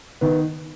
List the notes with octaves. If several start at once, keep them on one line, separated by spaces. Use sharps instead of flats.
D#3 B3